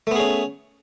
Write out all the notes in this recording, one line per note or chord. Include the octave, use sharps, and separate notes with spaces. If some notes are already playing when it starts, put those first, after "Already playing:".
A3 B3 C#4 G#4